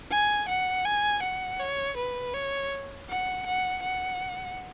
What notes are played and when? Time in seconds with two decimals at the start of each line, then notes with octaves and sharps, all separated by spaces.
0.11 G#5
0.49 F#5
0.86 G#5
1.23 F#5
1.60 C#5
1.98 B4
2.34 C#5
3.10 F#5
3.47 F#5
3.83 F#5